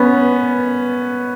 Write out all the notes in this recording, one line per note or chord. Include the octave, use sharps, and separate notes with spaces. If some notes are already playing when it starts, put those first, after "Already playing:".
Already playing: B3 C#4